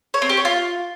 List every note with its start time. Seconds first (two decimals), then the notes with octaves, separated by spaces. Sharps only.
0.14 C#5
0.22 C4
0.29 G4
0.37 C#5
0.45 F4